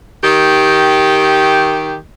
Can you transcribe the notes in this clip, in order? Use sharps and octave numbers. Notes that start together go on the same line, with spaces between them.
D#3 G4